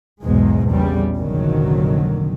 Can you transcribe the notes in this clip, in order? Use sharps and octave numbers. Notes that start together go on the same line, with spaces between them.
B1 E2 G#2 B2 G#3
A#1 E2 A#2 C#3 G3
F1 A#1 D3 D#3 F#3